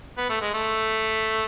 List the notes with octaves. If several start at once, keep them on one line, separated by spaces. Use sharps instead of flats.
B3
A3
G#3
A3